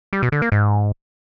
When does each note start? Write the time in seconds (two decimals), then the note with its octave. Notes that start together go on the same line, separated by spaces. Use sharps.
0.13 G3
0.22 B2
0.32 D3
0.42 A#3
0.52 G#2